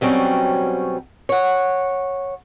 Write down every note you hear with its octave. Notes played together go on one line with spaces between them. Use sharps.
B2 F#3 G3 C4 C#4
C#5 F#5